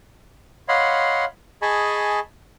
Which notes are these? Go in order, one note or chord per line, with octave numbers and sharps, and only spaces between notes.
C#5 D#5 F5 F#5 B5 C6
G#4 D#5 G#5 A5 B5 C#6